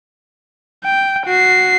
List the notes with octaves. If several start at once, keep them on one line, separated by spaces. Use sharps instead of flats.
G5
F#4 C7